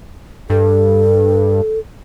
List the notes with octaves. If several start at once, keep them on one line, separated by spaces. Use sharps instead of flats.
G2 A4